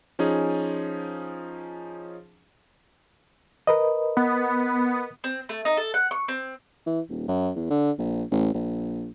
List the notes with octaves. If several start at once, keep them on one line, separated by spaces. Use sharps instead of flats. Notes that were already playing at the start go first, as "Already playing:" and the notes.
F3 C#4 D#4 G#4
A#4 B4 D#5
B3
C4
A3
D#4
A4
F#5
C#6
C4
E3
D#1
F#2
E2
D3
A#1
A1
A#1